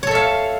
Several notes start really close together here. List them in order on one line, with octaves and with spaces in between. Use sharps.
C#5 A4 E5 F5